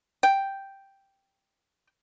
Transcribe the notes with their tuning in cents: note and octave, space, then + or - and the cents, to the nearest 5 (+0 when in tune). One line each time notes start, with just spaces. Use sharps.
G5 +0